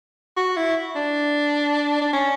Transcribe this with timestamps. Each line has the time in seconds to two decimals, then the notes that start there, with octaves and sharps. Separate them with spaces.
0.37 F#4
0.57 E4
0.96 D4
2.01 D4
2.13 C#4